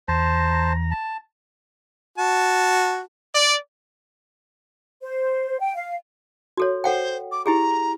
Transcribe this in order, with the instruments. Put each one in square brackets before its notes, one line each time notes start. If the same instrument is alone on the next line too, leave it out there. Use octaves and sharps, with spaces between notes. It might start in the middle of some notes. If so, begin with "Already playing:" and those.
[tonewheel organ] E2 A#5 [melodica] C5 A5
[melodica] A5
[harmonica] F#4 A5
[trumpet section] D5
[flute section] C5
G5
F5
[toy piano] F#4 A4 C#5
[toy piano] A4 F#5 G5 [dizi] C5
[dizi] D6
[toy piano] E4 G4 G#4 [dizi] A#5